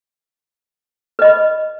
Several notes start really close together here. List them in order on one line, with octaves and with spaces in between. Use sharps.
B4 D#5 B5